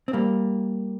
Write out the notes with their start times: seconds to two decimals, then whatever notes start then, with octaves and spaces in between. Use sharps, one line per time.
0.08 C4
0.13 G3 A#3